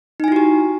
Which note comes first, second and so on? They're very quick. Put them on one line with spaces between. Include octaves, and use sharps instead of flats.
D#4 G#5 E4 F#4 G4